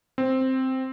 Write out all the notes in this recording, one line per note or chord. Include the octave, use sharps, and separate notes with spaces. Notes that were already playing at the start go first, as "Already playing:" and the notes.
C4